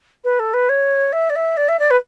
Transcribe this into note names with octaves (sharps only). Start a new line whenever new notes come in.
B4
A4
B4
C#5
E5
D5
E5
D5
E5
D5
B4